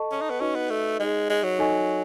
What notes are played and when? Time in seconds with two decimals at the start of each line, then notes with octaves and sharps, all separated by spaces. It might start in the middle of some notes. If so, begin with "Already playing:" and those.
Already playing: A4 D#5 A5 C#6
0.12 C#4
0.22 D#4
0.30 B3
0.40 C#4 D#4 F#4 B4 D#5
0.55 B3
0.70 A3
0.99 G#3 D#4 G#4 D#5
1.30 G#3
1.43 F#3
1.59 D#4 A4 D#5 G#5 C#6